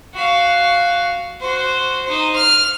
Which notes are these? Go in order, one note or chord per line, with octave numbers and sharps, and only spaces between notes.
F#4 F5
F#4 C5
D#4 C5
F6